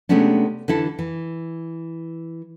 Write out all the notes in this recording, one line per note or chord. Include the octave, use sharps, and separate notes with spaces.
C3 G#3 A3 B3 C#4 D4
D3 E3 E4 A4
E3